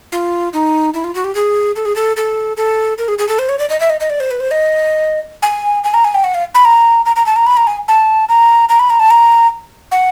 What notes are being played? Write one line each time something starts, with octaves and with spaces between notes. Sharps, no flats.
F4
D#4
E4
F4
F#4
G4
G#4
A4
G#4
A4
A4
A4
A#4
G#4
G#4
A4
C5
C#5
D5
D#5
E5
D#5
D#5
D5
C5
B4
C5
D#5
G#5
G#5
A#5
G#5
G5
F#5
F5
B5
A#5
A#5
A#5
A5
A#5
B5
A#5
G#5
A5
A#5
A#5
B5
A#5
A5
A#5
F#5